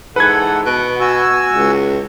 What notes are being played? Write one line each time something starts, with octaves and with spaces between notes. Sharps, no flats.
G#2 E3 A4 B4 F#5 G#6
B2 F#5
F#4 G#5 E6
C#2